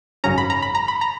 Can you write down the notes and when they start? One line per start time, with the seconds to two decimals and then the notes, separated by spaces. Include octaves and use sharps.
0.24 G#1 F#2 C#3 F#3 C#4 A#5
0.38 B5
0.50 A#5
0.62 B5
0.75 A#5
0.88 B5
1.01 A#5